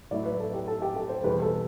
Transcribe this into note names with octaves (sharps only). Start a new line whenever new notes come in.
A2 F#3 A3 E4 D5
B4
A4
G4
A4
G4
A4
C5
E2 B2 G3 B4
A4